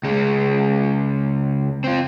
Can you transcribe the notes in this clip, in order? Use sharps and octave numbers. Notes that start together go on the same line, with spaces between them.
C#2 G#3
C4 F4